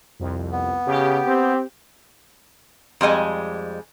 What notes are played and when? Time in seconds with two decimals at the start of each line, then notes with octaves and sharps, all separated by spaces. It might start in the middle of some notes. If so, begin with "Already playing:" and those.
0.20 C2 F2
0.52 B3
0.87 C#3 G4
1.26 C4
3.01 F2 G3 G#3 G#5